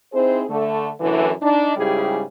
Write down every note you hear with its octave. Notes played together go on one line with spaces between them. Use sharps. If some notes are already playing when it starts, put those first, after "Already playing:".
C4 D#4 E4 G#4 C5
D3 A3
F#2 A2 D3 E3
D4 D#4
G#2 C#3 G3 E4 G4 G#4